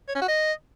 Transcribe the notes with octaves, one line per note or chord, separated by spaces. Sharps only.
C#5
C#4
F#4
D#5